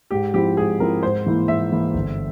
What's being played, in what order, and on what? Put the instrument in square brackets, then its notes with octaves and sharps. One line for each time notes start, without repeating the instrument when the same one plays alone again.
[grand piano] G#2 [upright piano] G4
[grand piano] F3 C4 E4 [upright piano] G4
[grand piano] G#2 [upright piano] G#4
[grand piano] F3 C4 E4 [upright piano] A#4
[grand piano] G#2 [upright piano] C5
[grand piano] E3 A#3 E4
[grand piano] G#2 [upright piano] E5
[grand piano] E3 A#3 E4
G1